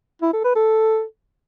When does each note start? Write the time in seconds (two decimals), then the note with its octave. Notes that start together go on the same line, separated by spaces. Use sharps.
0.22 E4
0.33 A4
0.44 B4
0.56 A4